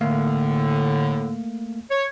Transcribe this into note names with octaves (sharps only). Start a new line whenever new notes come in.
A2 D3 A3 A#3 F5
C#5